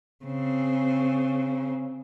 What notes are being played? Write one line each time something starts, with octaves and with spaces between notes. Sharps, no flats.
C#3 C4